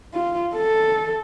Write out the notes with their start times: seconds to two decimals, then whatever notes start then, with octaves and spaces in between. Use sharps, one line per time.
0.13 F4
0.55 A4